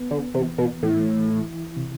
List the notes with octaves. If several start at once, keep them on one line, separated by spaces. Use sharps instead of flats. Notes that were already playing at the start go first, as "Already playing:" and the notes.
Already playing: B3
D3
C3 E3
B2
A2 E3
E4
C3